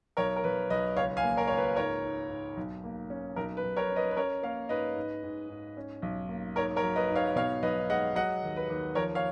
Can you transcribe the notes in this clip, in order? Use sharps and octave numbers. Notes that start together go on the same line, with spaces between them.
B1 A#4 C#5
A#4
B1 B4
B1 B4 D#5
C#2 C#5 F5
F5 G#5
A#3
A#4 C#5
C#2 C#5
B4
G#2 A#4 C#5
G#2
G#2
B1
A#3
C#4
B1 A#4
B4
B1
A#4 C#5
C#4
B4 D#5
B4
C#4 A#4 C#5
A#3 C#5 F5
G#2 B4 D#5
G#2
G#2
G#2
C#4
B1
A#3
G#2 A#4 C#5
A#4 C#5
F#3
B4 D#5
G#2
C#5 F5
B2 C#5 F5
B1 B4 D#5
G#3 D#5 F#5
F#3 D#5 F#5
D#2
B4
D#2
F3 A#4 C#5
C#5 F5